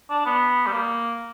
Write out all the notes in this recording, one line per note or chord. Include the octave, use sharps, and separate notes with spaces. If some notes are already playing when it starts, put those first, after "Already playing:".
D4
B3
G3
A#3